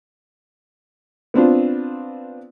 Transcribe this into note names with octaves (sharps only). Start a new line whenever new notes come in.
B3 C4 D4 F4